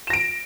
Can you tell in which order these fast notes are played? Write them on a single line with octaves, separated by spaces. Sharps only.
E7 A#6 D7